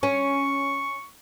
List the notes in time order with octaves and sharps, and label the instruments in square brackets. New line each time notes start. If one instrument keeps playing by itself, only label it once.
[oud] C#4 [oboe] C#6